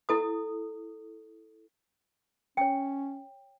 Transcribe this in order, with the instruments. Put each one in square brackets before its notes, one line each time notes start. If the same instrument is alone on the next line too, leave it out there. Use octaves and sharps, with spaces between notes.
[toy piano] E4 A4 D#6
[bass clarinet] C#4 [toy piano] C#5 G5